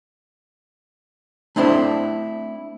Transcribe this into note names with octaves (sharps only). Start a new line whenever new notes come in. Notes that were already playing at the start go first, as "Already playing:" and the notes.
A3 C4 D4 E4 C5